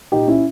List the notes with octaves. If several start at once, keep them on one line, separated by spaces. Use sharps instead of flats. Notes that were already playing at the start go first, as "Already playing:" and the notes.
A#2 D#4 G4
C#4 E4